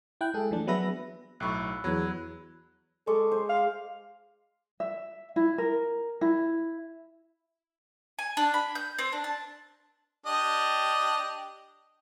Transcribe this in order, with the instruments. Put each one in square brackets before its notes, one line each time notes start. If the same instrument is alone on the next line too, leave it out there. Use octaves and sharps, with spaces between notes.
[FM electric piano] E4 G5 F#6
G#3 G#4 A4
E3 F3 A3 D4
F#3 B3 G#4 B4 E5 A#6
[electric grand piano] B1 A2 C#6 [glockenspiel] B5 E6 F#6
[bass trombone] E2 [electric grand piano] F#3 [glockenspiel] B5 F#6 G#6
[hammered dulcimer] G#3 C#6 D6 [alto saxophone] A4
[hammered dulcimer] C5
[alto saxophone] F5
[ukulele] E5
E4
A#4
E4
[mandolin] G#5
D4
B5
G6
C4
D4
A5
[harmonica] D4 G4 D#5